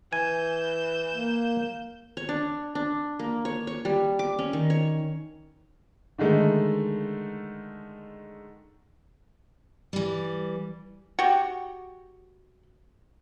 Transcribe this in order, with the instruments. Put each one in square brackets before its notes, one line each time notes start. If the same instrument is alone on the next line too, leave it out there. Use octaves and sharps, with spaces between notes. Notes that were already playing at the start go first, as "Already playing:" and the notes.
[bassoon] E3 [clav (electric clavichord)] G#5 [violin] G6 E7
[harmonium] A#3
[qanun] C#5
D4
D4
A#3
C#5
C#5
G3
D6
C#4
D#3
C#5
[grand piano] D3 D#3 G#3 A3
[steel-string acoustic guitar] E3 G3
[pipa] F#4 G4